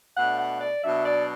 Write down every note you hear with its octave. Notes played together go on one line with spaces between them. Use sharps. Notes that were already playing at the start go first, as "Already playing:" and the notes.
B2 A3 D4 F#5
F#5
D5
B2 F#3 D4 E5
D5